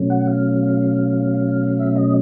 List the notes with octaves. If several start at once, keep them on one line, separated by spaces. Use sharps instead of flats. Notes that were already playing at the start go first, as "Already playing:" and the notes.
Already playing: B2 F#3 A3 C#4
F#5
F5
E5
D#5